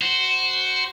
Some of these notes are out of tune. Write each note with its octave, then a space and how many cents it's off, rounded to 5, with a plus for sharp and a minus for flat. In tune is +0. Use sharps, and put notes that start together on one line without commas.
F#4 +10 C5 +0